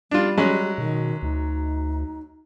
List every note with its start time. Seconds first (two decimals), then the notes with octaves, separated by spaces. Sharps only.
0.11 G3 D4 F4
0.37 F#3 G#3 C#4
0.78 B2 D#3
1.22 D2 D#4